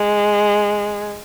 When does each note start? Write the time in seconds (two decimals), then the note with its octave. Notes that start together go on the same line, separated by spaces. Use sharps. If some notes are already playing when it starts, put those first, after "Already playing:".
Already playing: G#3